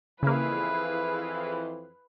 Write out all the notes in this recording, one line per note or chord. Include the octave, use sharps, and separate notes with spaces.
F2 C#3 E3 A#3 E4 G#4 B4 F5